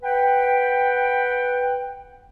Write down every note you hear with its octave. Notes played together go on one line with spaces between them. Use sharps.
B4 F#5 G5